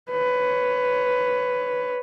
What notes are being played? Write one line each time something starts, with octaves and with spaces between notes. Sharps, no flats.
B4 C#5